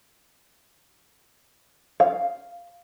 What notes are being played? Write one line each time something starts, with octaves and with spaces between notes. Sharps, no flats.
F5